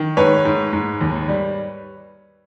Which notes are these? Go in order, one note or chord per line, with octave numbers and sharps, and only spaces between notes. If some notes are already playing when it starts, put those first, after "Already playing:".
Already playing: D#3
G#2 B4 C#5
G#2
G#2
D#2
G3